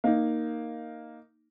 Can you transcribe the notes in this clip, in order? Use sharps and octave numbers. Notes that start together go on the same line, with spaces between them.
A#3 D#4